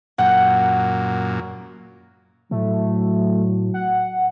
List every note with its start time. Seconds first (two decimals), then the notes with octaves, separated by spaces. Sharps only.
0.18 F#2 A#2 F#5 G5
2.51 A2 F#3 A3
3.74 F#5